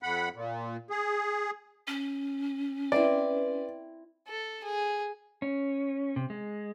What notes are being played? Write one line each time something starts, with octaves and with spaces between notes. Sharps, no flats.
F2 F#5 B5
A#2
G#4
C#4
C4 E4 B4 D5 E5
A4
G#4
C#4
C3
G#3